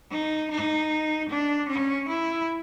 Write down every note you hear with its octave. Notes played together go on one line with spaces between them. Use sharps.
D#4
D#4
D4
C#4
E4